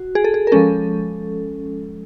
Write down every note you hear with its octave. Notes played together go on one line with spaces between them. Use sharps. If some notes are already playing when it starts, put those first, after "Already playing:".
Already playing: F#4
G#4
A4
G#4
A#4
F3 G#3 C#4 A4